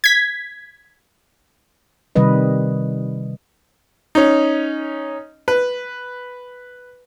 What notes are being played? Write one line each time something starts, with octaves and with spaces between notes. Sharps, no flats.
G#6 B6
C3 D#3 G3 B4 D#5
C#4 D#4
B4